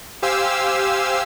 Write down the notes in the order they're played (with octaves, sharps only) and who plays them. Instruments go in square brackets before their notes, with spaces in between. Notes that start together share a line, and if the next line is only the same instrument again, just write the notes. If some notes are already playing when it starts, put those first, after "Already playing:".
[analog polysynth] G4 C5 F5 G#5 E6